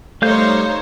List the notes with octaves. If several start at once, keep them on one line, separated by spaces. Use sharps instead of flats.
G3 A3 D#4 C5 C#5 F5 G6